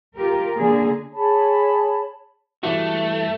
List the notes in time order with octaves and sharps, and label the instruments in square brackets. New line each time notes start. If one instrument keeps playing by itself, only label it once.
[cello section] F4 G4 A#4
D3 A#3 G#4
[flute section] G#4 C#5 A5 B5
[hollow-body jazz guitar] G2 E3 F#4 [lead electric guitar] A3